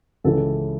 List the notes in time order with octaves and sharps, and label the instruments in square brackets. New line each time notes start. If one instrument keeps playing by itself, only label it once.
[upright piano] C#2 C#3 E3 A4